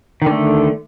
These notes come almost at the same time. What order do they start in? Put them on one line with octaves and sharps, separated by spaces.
D#3 D3 A3